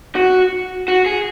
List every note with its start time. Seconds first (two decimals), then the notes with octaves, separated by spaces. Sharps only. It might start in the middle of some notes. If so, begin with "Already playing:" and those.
0.15 F#4
0.88 F#4
1.06 G#4